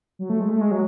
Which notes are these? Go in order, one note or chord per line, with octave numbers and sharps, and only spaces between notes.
F#3
A3
G#3
A3
G#3
F#3